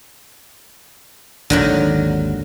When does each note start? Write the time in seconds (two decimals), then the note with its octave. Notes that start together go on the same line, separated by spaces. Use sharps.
1.50 G#1 D#2 D3 D#3 F#3